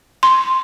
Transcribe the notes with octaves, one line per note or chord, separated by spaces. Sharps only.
C6